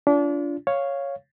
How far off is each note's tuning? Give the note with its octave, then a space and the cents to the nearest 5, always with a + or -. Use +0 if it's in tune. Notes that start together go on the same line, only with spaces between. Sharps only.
D4 -30 F4 -25
C#5 +0 F5 +0